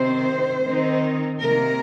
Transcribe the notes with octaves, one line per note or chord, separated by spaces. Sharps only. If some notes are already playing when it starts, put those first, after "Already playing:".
Already playing: C3 D#3 C4 C5
D#3 C4 D#4
C3 D#3 A#3 A#4